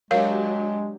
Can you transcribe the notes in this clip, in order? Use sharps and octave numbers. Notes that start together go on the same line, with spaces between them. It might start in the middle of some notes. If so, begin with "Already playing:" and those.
F#3 G#3 D4 G4 A#4 C#5 F5